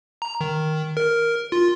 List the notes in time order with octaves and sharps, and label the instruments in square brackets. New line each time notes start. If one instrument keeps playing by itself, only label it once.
[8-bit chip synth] A#5
D#3
A#4
F4